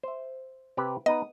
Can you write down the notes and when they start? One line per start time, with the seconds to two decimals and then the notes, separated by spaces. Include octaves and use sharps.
0.03 C5 E5
0.77 C3 G4 B4
1.06 B3 D#4 B4 D#5